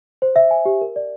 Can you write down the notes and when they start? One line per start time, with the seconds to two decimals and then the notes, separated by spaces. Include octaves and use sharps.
0.22 C5
0.36 E5
0.51 G#5
0.66 G4
0.81 A#4
0.96 D5